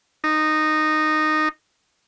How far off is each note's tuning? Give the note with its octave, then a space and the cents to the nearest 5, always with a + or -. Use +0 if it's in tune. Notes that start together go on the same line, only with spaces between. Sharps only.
D#4 -10